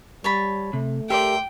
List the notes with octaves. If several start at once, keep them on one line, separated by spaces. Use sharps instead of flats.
G3 C#5 A5 B5
C3 A3
G4 A#4 D5 E5 G5 C6